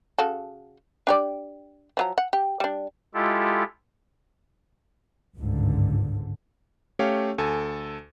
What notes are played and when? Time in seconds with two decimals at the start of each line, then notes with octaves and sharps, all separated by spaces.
0.18 C#3 F#4 A4
1.07 D4 G4 D5
1.97 F3 F#3 A#5
2.18 F#5
2.33 G4
2.60 G3 D4
3.14 G#3 E4 F4 G4 A4
5.38 G1 C#2 G#2 D3
6.99 A3 C#4 G4 C#5 F5
7.38 D2 A4 G#5